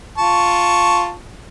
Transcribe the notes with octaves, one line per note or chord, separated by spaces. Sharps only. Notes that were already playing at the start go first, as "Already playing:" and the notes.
F4 A5 C#6